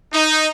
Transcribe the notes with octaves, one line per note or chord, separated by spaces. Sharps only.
D#4